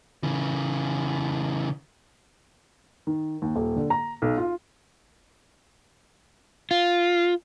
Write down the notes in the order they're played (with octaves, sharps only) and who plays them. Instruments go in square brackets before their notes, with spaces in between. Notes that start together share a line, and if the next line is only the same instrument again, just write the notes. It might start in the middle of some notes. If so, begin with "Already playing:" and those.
[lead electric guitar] C#3 E3
[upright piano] D#3
D#2
D#1
D3
A#5
B1
F4
[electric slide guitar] F4